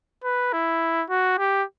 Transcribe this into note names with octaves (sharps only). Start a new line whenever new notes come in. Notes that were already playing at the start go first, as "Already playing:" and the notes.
B4
E4
F#4
G4